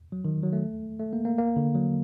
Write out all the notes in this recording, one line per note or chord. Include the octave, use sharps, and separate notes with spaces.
F#3
D#3
F#3
A3
A3
A#3
A#3
A#3
D3
F#3